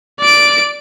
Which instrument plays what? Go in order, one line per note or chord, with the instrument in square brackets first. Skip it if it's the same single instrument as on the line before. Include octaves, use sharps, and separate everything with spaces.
[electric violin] D5 D7